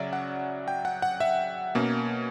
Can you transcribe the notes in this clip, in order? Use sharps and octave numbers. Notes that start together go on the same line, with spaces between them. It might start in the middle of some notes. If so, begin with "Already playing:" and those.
Already playing: C#3 F#3 C#4 D5 E5
F#5
G5
F#5
F#5
E5
B2 A#3 C#4